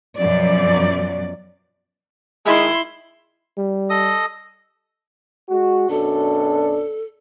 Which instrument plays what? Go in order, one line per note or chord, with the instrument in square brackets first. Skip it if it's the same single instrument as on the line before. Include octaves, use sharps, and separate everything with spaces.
[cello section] F#2 B2 F3 F#3 D5
[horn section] D#3 G#3 [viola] E4 C6
[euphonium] G3
[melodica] A4 D#5 D#6
[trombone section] G#3 F#4
[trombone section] F#2 B2 D4 [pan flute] A4